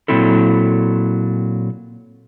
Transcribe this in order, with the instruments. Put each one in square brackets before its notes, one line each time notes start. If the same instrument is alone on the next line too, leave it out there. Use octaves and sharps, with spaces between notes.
[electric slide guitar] A#2 D#3 F#3 C4 E4 A4